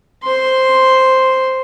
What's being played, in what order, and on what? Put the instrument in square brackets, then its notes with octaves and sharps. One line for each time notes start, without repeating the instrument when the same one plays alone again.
[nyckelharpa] C5 C6